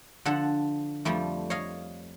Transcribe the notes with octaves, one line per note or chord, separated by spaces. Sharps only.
D3 F3 A4 F#5
F2 F3 G3 A3
C#5 D#5 F5